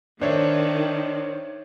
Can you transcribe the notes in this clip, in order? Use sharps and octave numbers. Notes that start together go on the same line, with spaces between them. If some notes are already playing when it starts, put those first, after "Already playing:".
D#3 D4 C5 C#5 E5